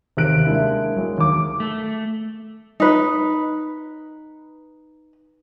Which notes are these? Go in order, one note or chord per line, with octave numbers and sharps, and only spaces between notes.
D#2 C3 A#4 F#6 D7
G#3 A#3 D4 E4
F#3 G#3 A#4
D#2 D6
A3
D#4 B4